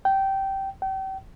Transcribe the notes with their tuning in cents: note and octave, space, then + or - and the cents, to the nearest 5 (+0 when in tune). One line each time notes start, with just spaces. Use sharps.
G5 -15
G5 -35